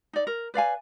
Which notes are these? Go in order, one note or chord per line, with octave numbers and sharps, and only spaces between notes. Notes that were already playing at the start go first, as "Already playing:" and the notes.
D#4 D5
A#4
B4 D5 F5 G#5